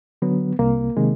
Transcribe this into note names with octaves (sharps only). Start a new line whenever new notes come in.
D3 F#3 B3
C2 A#3
C3 D#3 G#3